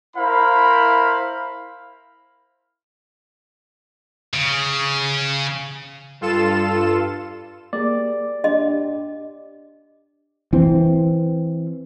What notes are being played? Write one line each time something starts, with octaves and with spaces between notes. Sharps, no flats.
E4 A#4 C5 F5 B5
C#3
G2 F4 A4 E7
A#3 G4 G#4 D5
D4 G4 D#5
E3 C4